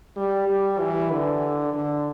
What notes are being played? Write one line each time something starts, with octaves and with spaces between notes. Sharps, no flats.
G3
G3
E3
D3
D3